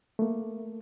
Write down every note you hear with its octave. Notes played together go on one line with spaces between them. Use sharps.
A3 A#3